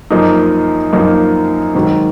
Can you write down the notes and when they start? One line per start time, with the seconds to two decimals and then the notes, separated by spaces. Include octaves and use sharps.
0.10 F#2 F3 A#3 D#4
0.93 F#2 F3 A#3 D#4
1.75 G#2 D#3 F#3